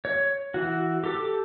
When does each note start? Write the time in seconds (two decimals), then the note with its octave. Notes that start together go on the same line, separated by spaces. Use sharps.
0.05 C#5
0.54 E3 F#4
1.04 G4 A4 D6